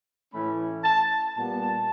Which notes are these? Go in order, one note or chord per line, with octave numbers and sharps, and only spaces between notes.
A2 E3 A3 C#4 B5
A5
A#2 G3 B3 A5